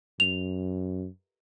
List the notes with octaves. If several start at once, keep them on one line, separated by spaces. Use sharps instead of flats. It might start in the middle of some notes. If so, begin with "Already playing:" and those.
F#2 F7